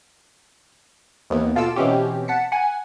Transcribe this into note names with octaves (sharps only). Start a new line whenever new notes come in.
D#2 E3 B3
B2 F4 A4 D6 E6
B2 E3 C4 C#4 G4
F#5 A5 B6 C#7
F#5 G#5